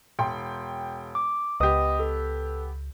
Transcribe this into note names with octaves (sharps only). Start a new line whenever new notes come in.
E1 G5 C6
D6
C#2 B3 G4 D#5 D#6
A4